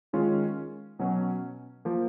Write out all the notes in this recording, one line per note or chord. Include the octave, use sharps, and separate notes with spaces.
D#3 G#3 C#4 F4
B2 F#3 C#4
F3 A#3